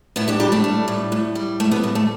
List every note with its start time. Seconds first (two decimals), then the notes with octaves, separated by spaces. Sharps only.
0.16 A2 B3 E4
0.28 D4 G4
0.40 G3 D4 G4
0.52 A3 D4
0.64 G3
0.88 A2
1.12 A2
1.35 G3
1.60 G3 A3
1.71 B3
1.83 A2 B3
1.95 A3